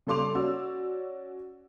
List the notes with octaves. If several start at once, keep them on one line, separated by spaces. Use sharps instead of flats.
C#3 G3 A4 C6 D6 F7
C#4 F#4 D5 E6